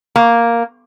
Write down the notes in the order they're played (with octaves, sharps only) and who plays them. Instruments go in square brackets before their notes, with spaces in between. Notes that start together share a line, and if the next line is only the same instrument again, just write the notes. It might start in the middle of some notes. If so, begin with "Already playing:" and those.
[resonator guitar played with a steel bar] A#3